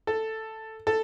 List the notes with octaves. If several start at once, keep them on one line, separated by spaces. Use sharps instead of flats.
A4
A4